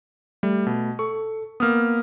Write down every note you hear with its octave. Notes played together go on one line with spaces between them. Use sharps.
G3 A3
B2
A4 C#6
A#3 B3 D#6 F6